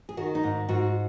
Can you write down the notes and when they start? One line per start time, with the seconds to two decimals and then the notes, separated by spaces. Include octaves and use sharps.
0.09 G#4
0.17 D#3 F#4
0.35 D#4
0.43 G#2
0.68 G#2 F#4